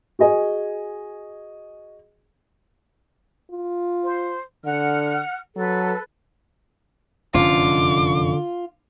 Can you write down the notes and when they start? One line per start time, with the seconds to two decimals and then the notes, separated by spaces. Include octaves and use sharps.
0.19 F#4 G#4 D#5 G#5
3.50 F4
4.04 C5
4.64 D3 F#5 F6
5.56 F#3 A4 B4
7.34 F1 F#2 D3 C#4 F4 D6